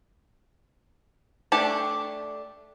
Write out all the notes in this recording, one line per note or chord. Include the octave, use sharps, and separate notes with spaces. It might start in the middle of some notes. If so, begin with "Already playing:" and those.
A3 D4 G4 D5